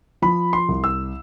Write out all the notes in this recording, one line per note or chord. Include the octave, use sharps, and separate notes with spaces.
F3 B5
C6
C2
E6